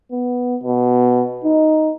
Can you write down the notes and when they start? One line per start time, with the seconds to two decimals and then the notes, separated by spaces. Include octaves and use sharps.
0.11 B3
0.63 B2
1.44 D#4